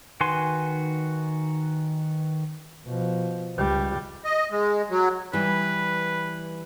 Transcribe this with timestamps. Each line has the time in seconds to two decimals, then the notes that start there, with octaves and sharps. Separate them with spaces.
0.21 D#3 F#4 B4 G#5 C6
2.85 B2 F3
3.56 C#2 G3
4.25 D#5
4.51 G#3
4.90 F#3
5.33 E3 G3 B4